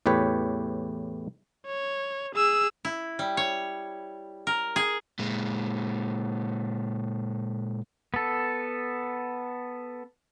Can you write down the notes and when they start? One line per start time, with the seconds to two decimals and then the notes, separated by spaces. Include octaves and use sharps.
0.06 E2 A2 G4 B4 C#5
1.66 C#5
2.35 G#4 E6
2.85 E4
3.19 G3
3.37 C#5
4.47 A#4
4.76 G#4
5.19 A#2 G#3
8.14 B3 A4